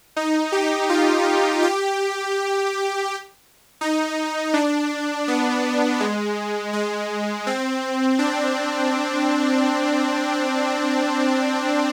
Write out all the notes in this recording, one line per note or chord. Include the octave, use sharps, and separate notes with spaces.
D#4
G4
F4
G4
D#4
D4
B3
G#3
G#3
C4
D4